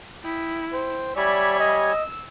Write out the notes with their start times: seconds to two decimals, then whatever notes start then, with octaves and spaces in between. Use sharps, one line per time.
0.24 E4 G5 B5 D#6
0.73 C5 G5
1.16 G3 C#5 D5 E5 G#5 B5
1.60 D#5
1.90 E6